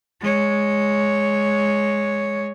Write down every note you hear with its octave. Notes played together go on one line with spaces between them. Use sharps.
G#3 C#5